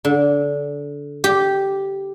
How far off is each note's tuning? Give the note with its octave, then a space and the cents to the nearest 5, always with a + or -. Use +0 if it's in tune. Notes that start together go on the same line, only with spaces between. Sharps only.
D3 -20
G4 -5